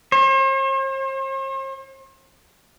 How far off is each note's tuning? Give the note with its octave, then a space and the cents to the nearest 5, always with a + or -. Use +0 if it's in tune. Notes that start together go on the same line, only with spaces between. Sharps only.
C5 +45